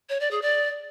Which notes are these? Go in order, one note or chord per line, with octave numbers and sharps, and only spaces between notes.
C#5
D5
G#4
D5